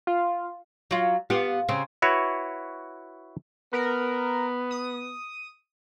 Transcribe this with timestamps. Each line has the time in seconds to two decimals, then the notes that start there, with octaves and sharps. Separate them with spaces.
0.07 F4
0.91 F#3 F4
1.30 B3 F4 G4
1.69 C#3 C4
2.02 E4 F#4 B4 C#5
3.73 B3 A#4
4.71 D#6